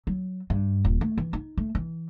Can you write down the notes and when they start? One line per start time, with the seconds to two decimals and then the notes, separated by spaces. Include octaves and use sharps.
0.07 F#3
0.50 G2
0.85 D#1
1.01 A3
1.18 E3
1.33 D#4
1.57 A3
1.75 E3